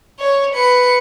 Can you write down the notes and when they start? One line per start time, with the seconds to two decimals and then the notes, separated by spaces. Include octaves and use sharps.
0.19 C#5
0.54 B4 C#7